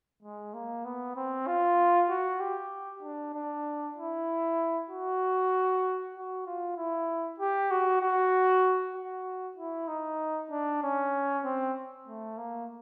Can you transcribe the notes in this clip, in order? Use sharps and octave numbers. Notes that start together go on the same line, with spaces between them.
G#3
A#3
B3
C4
F4
F#4
G4
D4
D4
E4
F#4
F#4
F4
E4
G4
F#4
F#4
F#4
E4
D#4
D4
C#4
C4
A3
A#3